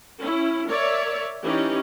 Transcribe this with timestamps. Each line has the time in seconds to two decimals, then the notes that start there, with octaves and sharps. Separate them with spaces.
0.19 C#4 E4
0.67 A#4 C#5 D5 E5
1.42 E3 C#4 D#4 G4